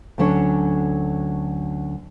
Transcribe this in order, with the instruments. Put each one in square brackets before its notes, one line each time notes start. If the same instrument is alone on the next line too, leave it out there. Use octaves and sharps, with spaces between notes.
[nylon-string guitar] D2 D3 F#3 C#4 D4 C#5